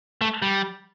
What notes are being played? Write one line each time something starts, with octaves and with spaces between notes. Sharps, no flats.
A3
G3